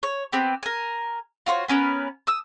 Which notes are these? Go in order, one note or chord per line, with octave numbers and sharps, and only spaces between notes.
C#5
B3 C4 G4
A#4 G#5
F4 F#4 C5 C#5
B3 C#4 A#4 B4
D#6 E6